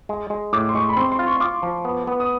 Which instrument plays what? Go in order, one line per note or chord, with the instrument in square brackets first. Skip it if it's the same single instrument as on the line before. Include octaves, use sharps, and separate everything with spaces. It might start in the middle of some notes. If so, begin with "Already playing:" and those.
[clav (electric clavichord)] G#3
G#3
[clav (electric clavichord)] A2 [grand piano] D6
[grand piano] C6
[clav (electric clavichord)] G#3 [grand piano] C#6
[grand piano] B5
[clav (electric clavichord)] C4 [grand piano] C6
[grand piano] C6
[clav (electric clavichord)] F4
[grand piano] C#6
[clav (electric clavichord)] F4 [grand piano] D6
[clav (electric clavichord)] F3
B3
B3
[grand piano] D#6